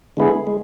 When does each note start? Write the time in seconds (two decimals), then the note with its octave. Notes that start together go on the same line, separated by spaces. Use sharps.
0.17 D3 G#3 B3 E4 G#4
0.47 G#3